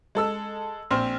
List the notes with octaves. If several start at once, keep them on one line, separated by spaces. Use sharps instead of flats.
G#3 A4 E6
A#1 C4 C5 F6